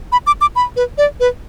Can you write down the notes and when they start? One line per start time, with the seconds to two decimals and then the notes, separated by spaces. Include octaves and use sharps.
0.12 B5
0.27 D6
0.41 D6
0.56 B5
0.76 B4
0.98 D5
1.20 B4